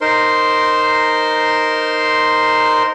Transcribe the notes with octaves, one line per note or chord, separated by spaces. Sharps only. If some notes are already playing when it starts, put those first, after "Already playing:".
D#4 A#4 C5 C6